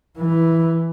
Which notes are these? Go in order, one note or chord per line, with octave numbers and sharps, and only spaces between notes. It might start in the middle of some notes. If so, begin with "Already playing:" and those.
E3